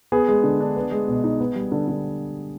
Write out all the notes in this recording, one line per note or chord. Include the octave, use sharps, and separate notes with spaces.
B3 G#4
G#3
D3
D4
B3
G#3
B2
D#4
B3
G3
D3
D3